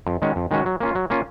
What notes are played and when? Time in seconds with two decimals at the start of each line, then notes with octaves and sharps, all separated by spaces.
0.07 F2
0.22 D#3 G#3 C#4 F#4
0.36 F2
0.51 D#3 G#3 C#4 F#4
0.66 F#3
0.80 A#3 C#4 F4
0.95 F#3
1.10 A#3 C#4 F4